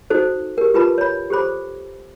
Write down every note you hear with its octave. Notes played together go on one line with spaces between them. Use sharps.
D#4 F#4 A4 C5
G4 A#4
F4 G4 B4 A5 B5
C#5 B5
G4 A4 C5 B5 D6